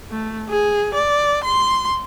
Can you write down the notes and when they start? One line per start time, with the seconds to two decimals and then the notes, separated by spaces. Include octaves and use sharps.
0.11 A3
0.50 G#4
0.95 D5
1.45 C6